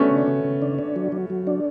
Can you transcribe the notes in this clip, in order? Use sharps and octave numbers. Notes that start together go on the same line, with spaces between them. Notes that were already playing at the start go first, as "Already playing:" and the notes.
Already playing: A3 B3 C#4 D4
C#3
C#3
C#3
D4
D4
F#3
F#3
F#3
D4